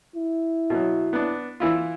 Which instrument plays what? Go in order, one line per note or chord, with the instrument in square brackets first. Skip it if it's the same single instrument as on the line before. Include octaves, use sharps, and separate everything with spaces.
[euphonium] E4
[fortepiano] B2 F#3
B3 D4
E3 E4 F4